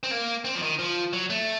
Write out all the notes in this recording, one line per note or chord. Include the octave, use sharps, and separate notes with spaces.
C4
A#3
C4
F3
D#3
F3
F#3
A3